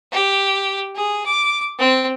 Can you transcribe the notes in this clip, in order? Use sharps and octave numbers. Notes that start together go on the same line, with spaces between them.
G4
G#4
D6
C4